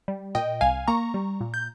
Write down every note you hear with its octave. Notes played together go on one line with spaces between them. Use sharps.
G3
A#2 D#5 G5
C2 F5 G#5
A#3 A#5 C#6
G3
A#2
G6